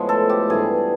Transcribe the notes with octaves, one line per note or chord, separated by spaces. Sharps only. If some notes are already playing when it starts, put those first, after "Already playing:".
Already playing: A2 F3 G#3 B3
A4
G4
G2 E3 G3 G#4